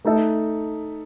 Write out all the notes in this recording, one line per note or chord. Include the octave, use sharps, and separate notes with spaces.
A3 D#4 A4 E5